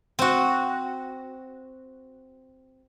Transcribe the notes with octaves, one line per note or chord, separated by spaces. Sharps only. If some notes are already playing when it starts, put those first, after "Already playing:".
C4 F#4